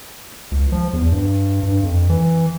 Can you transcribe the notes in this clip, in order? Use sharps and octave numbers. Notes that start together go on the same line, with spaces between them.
C#2
F3
E2
G2
G2
F2
E3